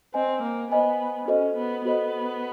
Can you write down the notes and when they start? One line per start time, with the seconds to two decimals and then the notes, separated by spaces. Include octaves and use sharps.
0.14 C4 C5 D#5 G#5
0.43 A#3
0.71 B3 C5 D#5 G#5
1.28 C#4 F#4 A4 C5 D#5
1.57 B3
1.85 B3 F#4 A4 C5 D#5